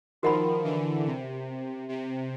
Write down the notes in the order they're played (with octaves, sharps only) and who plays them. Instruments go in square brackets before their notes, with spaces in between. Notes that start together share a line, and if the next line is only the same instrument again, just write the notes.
[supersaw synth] D#3 F3 [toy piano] F#4 A#4 D#5 F#5 B5
[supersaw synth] D3 E3
C3
C3